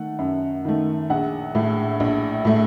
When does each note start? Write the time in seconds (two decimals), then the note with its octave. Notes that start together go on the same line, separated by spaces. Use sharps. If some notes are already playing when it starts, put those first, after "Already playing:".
Already playing: D#3 A3 F#5
0.18 F#2
0.65 D#3 A3
1.10 A#1 F#5
1.55 A2 A3
2.00 A#1
2.45 A2 A3